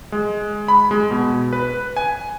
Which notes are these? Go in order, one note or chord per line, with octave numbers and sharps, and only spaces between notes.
G#3
B5
G#3
B2
B4
G#5